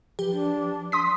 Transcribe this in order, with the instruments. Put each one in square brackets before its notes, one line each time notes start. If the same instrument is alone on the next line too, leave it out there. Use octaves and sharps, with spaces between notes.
[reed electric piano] F3 B4 [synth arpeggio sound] G4
[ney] D4
[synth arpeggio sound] C6 D#6 B6